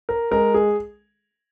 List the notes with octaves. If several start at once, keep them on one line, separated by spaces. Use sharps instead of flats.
A#4
G#3 A#4
G#4